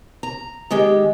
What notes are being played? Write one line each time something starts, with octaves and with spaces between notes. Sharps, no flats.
A#5
D#3 G#3 G4